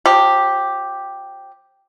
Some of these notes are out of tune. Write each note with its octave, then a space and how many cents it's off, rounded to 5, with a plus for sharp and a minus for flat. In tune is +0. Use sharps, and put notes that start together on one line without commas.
F3 +35 G4 +0